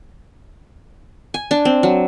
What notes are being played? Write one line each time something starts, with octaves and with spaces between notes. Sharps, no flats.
G#5
D4
C4
F#3